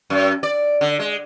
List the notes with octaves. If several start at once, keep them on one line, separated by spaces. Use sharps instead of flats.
F#2
D5
D3
G#3